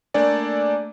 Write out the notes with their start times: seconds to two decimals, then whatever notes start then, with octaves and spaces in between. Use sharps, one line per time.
0.14 A3 A#3 D4 A4 D5 G#5